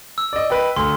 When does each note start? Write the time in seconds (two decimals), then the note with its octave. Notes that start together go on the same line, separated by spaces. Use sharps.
0.18 E6
0.33 D5 D#5
0.50 B4 D#5 G5
0.76 D2 C6